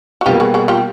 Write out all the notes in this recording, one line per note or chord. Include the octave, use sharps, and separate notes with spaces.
F#4
B2 G3 A#3 F4 G4
F#4 G#4
F#4 G#4
F4 G4